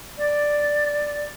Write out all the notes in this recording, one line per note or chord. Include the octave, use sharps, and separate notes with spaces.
D5